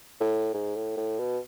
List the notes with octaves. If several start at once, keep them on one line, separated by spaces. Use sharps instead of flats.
A2
G#2
A2
A2
B2